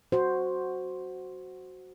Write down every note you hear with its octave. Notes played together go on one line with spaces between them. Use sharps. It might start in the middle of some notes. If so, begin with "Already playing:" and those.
F#4 C5